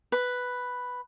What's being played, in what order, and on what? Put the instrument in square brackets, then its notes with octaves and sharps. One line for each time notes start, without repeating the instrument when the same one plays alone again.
[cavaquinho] B4